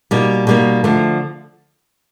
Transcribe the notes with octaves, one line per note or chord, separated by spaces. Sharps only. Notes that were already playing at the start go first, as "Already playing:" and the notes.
B2 G3 A#3 D#4
B2 G3 A#3 D#4
D3 F3 A3